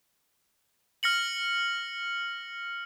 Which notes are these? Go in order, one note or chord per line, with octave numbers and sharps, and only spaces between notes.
F6 A#6 C#7 F#7